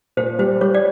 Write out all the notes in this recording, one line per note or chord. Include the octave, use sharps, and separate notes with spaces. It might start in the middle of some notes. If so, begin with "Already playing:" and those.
A#2 C5
G3 C5
G3 C#5
D5